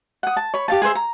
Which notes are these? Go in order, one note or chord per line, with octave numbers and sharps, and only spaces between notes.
F#5 D#6
A5
C#5 B5
G4 F5 A5
G#4 B4 C5 E5
A#5